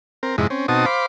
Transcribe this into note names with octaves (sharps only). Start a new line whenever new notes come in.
C4 A#4
F2 G#2 C3 G#3 E4
C4 C#4
B2 C4 D#4 F#4 A5 D#6
C5 F5 B5 D6